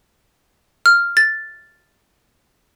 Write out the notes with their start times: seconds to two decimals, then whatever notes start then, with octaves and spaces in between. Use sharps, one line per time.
0.86 F6
1.17 A6